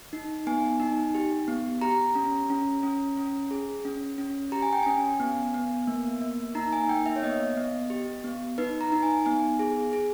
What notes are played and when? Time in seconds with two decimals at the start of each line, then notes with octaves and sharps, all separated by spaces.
0.13 D#4
0.47 B3 G#5
0.80 D#4
1.15 G4
1.48 B3
1.81 G4 A#5
2.15 C#4
2.50 C#4
2.83 C#4
3.18 C#4
3.51 G#4
3.85 C#4
4.18 C#4
4.52 G4 A#5
4.62 G#5
4.73 G5
4.83 C#4 G#5
5.20 B3
5.54 B3
5.87 A#3
6.22 A#3
6.55 D#4 A#5
6.73 G#5
6.89 A#3 G5
7.06 E5
7.16 C#5
7.22 B3 D#5
7.57 B3
7.90 G4
8.24 B3
8.58 D#4 B4
8.81 A#5
8.92 D#4
9.03 G#5
9.25 B3 G#5
9.59 G#4
9.93 G#4